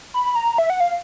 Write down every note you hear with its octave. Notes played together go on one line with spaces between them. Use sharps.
B5
A#5
E5
F#5
F5